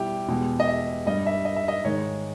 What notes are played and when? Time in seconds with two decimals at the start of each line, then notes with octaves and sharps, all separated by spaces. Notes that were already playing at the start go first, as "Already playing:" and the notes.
Already playing: B2 G3 E4 G4
0.28 E2 B2 G#3
0.60 D#5
0.67 E5
1.06 G2 G3 D#5
1.26 E5
1.45 D#5
1.56 E5
1.68 D#5
1.84 G#2 D#3 G#3 C#5